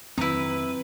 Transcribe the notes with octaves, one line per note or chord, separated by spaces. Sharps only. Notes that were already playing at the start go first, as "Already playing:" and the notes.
F2 D#3 F#3 C4 D#4 E4 B4 A#5